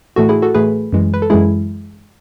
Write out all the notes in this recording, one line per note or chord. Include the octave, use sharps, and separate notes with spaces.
A2 E3 A3 F#4 A4
E4 G#4
F#4 A4
A2 E3 A3 G#4 B4
F#2 E3 G#3
B4
A4
F#2 E3 G#3 E4 G#4